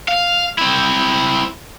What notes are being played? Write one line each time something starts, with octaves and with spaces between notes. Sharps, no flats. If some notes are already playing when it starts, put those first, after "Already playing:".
F5
C4 E4